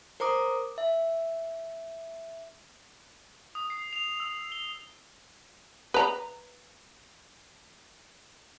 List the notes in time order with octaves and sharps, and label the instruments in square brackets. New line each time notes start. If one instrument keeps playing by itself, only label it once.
[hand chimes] A#4 C5 A#5 D6 D#6
E5
[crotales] D#6
C7
F7
E6
G7
[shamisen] B4 A#5